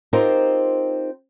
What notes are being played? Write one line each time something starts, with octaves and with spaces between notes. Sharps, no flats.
C4 D#4 F4 G4 A#4 C5